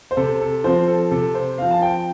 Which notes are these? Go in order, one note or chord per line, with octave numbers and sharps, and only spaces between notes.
C5
C3 A4
A4
F3 C4 C5
A4
C3 A4
C5
F3 C4 F5
A5
G5